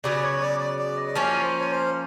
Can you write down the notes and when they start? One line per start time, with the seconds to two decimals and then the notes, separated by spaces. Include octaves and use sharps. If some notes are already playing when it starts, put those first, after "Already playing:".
0.04 C#3 F#3 B3 D5
0.23 C#5
0.42 D5
0.60 D5
0.79 D5
0.97 D#5
1.08 D5
1.15 F3 A#3 C#4 C#5
1.42 C5
1.60 C#5
1.71 C5